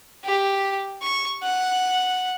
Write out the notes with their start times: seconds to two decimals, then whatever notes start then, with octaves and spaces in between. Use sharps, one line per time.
0.24 G4
1.02 C#6
1.43 F#5